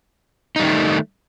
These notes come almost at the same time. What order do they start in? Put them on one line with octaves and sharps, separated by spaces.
D#4 G3 D#3 A3